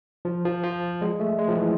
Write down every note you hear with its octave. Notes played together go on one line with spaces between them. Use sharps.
F3
F3
F3
G#3
A3
G#3
F3
E3